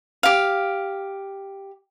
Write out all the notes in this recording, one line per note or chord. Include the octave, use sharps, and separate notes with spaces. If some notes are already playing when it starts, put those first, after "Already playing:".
G4 F5